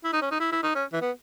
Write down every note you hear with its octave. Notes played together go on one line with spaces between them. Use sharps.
E4
D#4
C#4
D#4
E4
E4
D#4
C#4
E3
B3